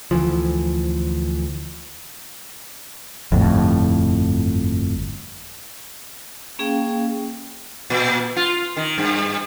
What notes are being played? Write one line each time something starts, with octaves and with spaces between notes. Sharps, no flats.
D2 E3 F3
G1 F2 A2
A#3 C#4 G#4 F5 G5
A#2
F4
D#3
G2